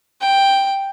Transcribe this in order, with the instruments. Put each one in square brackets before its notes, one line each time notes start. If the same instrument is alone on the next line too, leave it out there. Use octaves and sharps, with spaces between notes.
[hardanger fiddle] G5